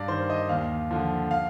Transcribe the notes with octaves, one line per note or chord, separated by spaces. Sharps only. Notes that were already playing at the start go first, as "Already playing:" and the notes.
Already playing: G2 D5 F5
D#3 C5
D#5
D#2 F5
D3 F3
F5